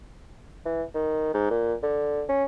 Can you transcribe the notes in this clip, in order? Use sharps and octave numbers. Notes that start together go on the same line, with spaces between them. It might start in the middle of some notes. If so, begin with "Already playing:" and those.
E3
D#3
G#2
A#2
D3
C#4